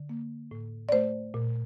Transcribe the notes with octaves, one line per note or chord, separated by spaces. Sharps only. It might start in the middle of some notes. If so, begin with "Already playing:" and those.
Already playing: D3
A#3
A2
D5
A3 C5
A#2